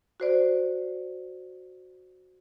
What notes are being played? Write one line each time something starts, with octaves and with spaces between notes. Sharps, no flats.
F#4 C5 D5